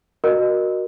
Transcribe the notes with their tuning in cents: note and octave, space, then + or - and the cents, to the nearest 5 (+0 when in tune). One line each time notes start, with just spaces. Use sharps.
F#4 +0 A#4 +10 D#5 -25